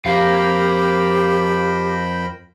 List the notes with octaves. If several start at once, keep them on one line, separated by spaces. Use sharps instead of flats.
F2 G4 A#4 C5 F5 G5 B5